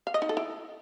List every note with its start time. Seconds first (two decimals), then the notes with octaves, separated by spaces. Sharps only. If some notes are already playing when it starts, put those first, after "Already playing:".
0.07 F5
0.14 D#5
0.22 D#4
0.29 A4
0.37 E4